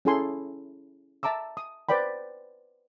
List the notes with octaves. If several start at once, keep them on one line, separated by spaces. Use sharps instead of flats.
C#4 E4 G#4 A4 G#5 C6
E5 A5 A#5 D6 E6
D#6
B4 C5 D5 G5 B5